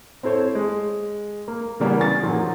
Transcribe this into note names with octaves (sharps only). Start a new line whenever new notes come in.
C4 E4 A4 C5 C#5
G#3
A#3
C#3 E3 G3 A#3 B3 C#4
G#5 C#6 A6
A#2 D#3 F3 F#3